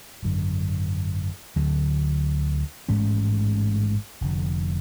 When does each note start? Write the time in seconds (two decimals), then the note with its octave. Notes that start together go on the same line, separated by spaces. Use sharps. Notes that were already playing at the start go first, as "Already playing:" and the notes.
0.22 G#1 F#2 D3
1.56 D2 D3 F#3
2.89 A1 G#2 G#3 C#4
4.21 F1 F2 D3